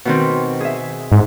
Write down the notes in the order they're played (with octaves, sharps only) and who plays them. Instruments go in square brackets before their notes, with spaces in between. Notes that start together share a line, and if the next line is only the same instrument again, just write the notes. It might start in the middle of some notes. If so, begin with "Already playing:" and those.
[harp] B2 D#3 C4
G#4 E5
[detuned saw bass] G#2